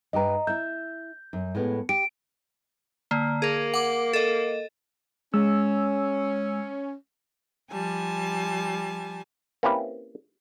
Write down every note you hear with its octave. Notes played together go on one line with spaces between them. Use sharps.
G2 G4 B4 D#5 A#5
E4 E5 G6
F#2
A2 G#3 B3
G4 D7
D3 A#3
A#3 G#4 A#4
F#5 D6
A4 D#5
G#3 C#4 E6
F3 G3 G#5 A5
A#3 C4 C#4 E4 G4 B4